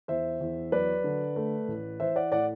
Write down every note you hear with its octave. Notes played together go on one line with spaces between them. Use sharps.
E2 C5 E5
E2
F#3 B4 D5
D3
A3
A1
E3 C5 E5
D5 F#5
A2 D5 F#5